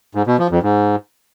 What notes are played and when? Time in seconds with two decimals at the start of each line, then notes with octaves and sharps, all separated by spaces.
0.15 G#2
0.27 B2
0.39 F3
0.51 F2
0.63 G#2